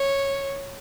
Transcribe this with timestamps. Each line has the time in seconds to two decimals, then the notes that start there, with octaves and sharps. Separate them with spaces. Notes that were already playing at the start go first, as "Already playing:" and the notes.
Already playing: C#5